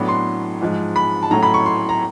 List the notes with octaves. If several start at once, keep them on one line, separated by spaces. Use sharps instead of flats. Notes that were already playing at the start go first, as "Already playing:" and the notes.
Already playing: A2 F#3 B3 D4
C6
G#2 F3 G#3
B5
A5
A2 F#3 A3 C#4 A#5
B5
C#6
C6
A#5